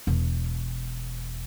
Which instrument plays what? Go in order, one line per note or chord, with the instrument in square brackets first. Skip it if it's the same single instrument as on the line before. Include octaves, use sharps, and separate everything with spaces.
[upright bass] E1